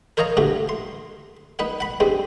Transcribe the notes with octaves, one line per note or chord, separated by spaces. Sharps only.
A#4 C5 C#5 D#5 F5 A#5
G2 D3 A3 F#4
C6
D#4 B4 F#5
F#5 B5
G2 G#3 C4